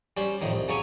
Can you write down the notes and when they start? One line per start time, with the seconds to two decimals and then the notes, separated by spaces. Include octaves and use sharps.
0.17 G3 C#4 C5
0.41 F2 A2 D#3
0.53 C2
0.68 C#3 F#3 C#5 G#5